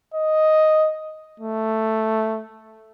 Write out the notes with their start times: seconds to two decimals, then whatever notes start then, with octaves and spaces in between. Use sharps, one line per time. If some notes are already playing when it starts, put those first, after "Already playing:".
0.14 D#5
1.40 A3